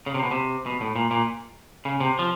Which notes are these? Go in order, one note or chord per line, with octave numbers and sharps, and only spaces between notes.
C#3
C3
B2
C3
B2
A2
A#2
A#2
C#3
C3
F3